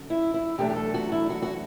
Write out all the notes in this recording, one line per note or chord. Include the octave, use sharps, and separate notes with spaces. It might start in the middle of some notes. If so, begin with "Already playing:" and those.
Already playing: F#2 D3
E4
E4
E2 B2 F#3 A3 D4 G4
G4
A4
F#4
E4
F#4
F#4